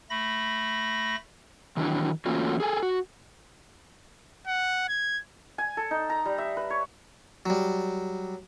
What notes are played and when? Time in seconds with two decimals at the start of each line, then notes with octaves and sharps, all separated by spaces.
0.10 A3 B5 A#6
1.77 D#3 E3 F#3 D4
2.26 E3 A3 A#3 C#4 F4 F#4
2.60 G#4 A4 G#5
2.83 F#4
4.47 F#5
4.88 G#6
5.58 G#5
5.77 A4
5.91 D#4
6.10 A#5
6.25 G3
6.38 E5
6.57 B4
6.70 C#5
7.46 F#3 G3